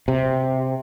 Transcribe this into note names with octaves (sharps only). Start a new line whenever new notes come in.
C3